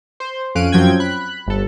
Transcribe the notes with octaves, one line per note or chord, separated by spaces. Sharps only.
C5
F2 C#4 F5 F#6 D7 D#7
F#2 F3 F#3 C4 G5 G#6
B5 F#6
G1 A4